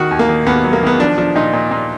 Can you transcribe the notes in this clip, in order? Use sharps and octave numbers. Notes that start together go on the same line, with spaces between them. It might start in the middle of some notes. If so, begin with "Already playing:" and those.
Already playing: D#3 F#4
D#2
A#3
D#3
D#2 B3
F#3
A#3
D#3 B3
F3 D4
F3 D4
A#2 D#4
A#2
A#2